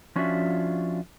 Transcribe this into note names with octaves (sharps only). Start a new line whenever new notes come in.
F3 C#4 D4 F4 F#4 E5